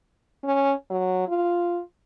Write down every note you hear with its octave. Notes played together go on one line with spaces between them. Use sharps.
C#4
F#3
F4